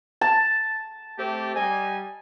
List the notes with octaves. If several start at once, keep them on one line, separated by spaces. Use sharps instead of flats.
A5
A3 C4 G4
G3 D#5 G#5